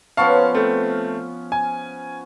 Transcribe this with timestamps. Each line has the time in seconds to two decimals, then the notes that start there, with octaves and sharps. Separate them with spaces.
0.17 F3 B3 C#4 F5 A5 C#6
0.54 A3 C4
1.52 G#5